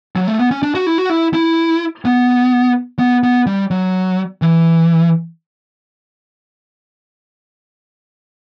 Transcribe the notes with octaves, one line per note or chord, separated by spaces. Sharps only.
F#3
A3
B3
C#4
D4
F#4
E4
F#4
E4
E4
B3
B3
B3
G3
F#3
E3